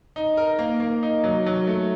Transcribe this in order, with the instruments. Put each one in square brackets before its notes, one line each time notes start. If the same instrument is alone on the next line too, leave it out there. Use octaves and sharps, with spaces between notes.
[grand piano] D#4
A#4
A#3
A#3
D#4
F#3
F#3
A3